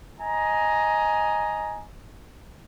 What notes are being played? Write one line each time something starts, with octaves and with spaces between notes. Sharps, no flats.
D#5 G#5 A#5